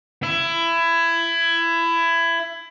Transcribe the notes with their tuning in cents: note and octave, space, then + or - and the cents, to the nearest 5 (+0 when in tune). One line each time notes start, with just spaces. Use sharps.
E4 +20